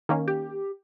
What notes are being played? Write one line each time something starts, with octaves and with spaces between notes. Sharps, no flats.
D#3 A#3 C#4
G4